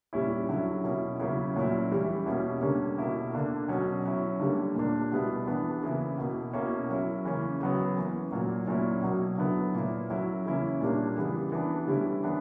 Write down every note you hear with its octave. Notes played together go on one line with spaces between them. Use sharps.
A#2 G3 C#4 E4
D3 F#3 C#4 E4
B2 A#3 C#4 E4
C#3 F#3 A#3 C#4 E4
A#2 F#3 C#4 E4
E3 G3 C#4 E4
B2 A#3 C#4 E4
D3 G3 A#3 C#4
B2 A#3 E4
D3 A#3 D4
B2 F#3 C#4
F#3 C#4 E4
D3 G3 A#3
A#2 A#3 D4
B2 G3 B3 E4
E3 B3 D4
C#3 E3 A#3 E4
B2 A#3 E4
B2 A#3 C#4 E4
F#3 C#4 E4
C#3 E3 A#3 C#4
C#3 F#3 B3
E3 A#3 C#4
A#2 F#3 A#3
A#2 F#3 C#4 E4
B2 F#3 A#3
D3 F#3 B3 E4
A#2 A#3 E4
F#3 C#4 E4
C#3 E3 A#3 C#4 E4
A#2 G3 A#3 D4
C#3 E3 G3 B3
E3 B3 D4
D3 G3 C#4 E4
E3 B3 D4